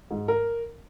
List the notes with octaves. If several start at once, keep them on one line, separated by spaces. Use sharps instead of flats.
G#2
A#4